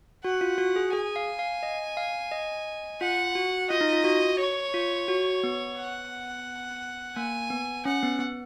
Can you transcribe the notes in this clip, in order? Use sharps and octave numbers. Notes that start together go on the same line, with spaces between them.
F#4 F#5
F4
F#4
G#4
G#4 G#5
F5
F5
D#5
F5
D#5
F4 F#5
F#4
F4 D#5
D#4
F4
F#4
C#5
F4
F#4
B3
F#5
A#3 G#5
B3
C#4 F#5
B3
B3